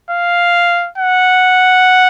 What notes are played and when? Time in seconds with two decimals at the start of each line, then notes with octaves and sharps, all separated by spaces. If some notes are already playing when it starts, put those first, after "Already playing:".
0.10 F5
0.98 F#5